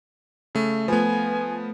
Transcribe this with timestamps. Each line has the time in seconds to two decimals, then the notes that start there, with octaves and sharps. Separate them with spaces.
0.55 C#3 A3
0.88 F3 A3 B3 F4 B4 G#5